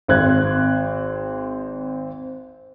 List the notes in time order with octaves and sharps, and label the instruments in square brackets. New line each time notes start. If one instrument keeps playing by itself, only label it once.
[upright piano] G#1 C4 F#6 G#6